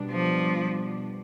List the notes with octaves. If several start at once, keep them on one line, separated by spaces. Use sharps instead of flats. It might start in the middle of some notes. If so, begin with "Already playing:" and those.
Already playing: B2 G3 D4
F3